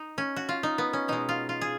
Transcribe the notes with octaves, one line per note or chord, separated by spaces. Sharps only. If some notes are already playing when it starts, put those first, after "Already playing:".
Already playing: D#4
C#4
F#4
F4
D#4
B3
C#4
B2 G#3 D#4
F4
F4
G#4